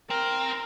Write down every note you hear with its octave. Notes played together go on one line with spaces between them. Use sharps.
C4 A#4